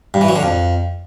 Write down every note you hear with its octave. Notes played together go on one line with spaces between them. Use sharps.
G2
E3
F#3
D3
F2